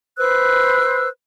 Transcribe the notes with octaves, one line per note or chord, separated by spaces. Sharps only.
B4 C5 E6 F#6